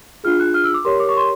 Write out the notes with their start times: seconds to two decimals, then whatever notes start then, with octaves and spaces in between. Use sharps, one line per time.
0.24 D4 F4 G#4 F6
0.40 F#6
0.54 F6
0.64 E6
0.74 D6
0.85 G4 A#4 C#5 C6
1.00 D6
1.09 C#6
1.17 C6